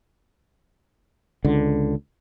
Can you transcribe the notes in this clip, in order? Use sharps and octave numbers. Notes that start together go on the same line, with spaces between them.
C#2 D3